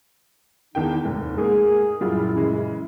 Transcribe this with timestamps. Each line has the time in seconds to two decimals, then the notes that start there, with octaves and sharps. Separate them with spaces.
0.75 E2 D#3 E3 D4 D#4 G5
1.05 F1 D#2 G#2
1.38 G#2 A#3 G#4
2.01 F#2 A#2 F#3 G3 E4 F4
2.36 C#3 E3 G#3